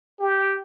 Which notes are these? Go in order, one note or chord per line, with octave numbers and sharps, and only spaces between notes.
G4